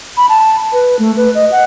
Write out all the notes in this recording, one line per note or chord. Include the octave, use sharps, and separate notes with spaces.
B5
A5
B4
A3
B4
D#5
F#5